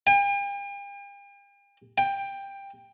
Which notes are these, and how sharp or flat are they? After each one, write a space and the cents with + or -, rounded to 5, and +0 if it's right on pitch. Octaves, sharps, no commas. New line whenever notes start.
G5 +45
G5 +15